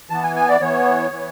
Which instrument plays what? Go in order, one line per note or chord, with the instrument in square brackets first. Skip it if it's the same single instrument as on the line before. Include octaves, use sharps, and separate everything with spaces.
[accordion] E3 B3 A5
G#5
G#5
D5
E3 B3 C#5
E3 B3